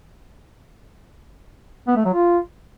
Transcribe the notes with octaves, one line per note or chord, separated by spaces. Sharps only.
B3
A3
F#3
F4